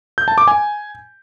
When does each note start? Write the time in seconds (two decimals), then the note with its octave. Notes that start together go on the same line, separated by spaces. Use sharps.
0.18 G6
0.28 A5
0.38 D6
0.48 G#5